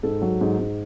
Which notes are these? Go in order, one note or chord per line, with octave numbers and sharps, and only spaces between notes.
G#2 A4
F#3
G#2
G#2